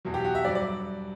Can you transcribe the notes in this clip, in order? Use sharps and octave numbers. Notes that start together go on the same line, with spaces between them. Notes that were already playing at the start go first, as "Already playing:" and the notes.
E2 B2 F#3
G4
F#4
E5
G2 F#3 D5
D5